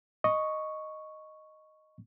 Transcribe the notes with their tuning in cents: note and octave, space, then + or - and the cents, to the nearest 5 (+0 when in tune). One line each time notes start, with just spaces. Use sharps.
D#5 +0 C#6 +0